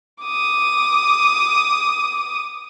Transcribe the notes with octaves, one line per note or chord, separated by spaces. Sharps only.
D6 D#6